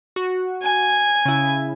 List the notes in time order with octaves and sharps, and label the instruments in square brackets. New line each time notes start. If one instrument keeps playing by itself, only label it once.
[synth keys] F#4
[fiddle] G#5
[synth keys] C#3 E4